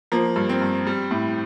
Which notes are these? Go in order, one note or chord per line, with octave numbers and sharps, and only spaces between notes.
F3 A#3
G2
C4
G2
G3
A2